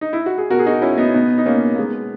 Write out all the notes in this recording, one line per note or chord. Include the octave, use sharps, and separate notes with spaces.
D#4
E4
F#4
G#4
B2 F#4 A#4
G#4
D#4 F#4
C#4 E4
B3 D#4
B2 B3 D#4
D#4
A#3 C#4
A#3
B2 G#3 B3